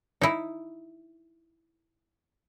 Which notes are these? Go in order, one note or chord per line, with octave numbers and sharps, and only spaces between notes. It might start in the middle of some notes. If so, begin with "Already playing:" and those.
D#4 E4